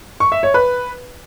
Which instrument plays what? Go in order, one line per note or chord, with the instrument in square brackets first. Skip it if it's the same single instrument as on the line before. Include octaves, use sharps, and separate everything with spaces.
[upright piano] C#6
E5
C#5
B4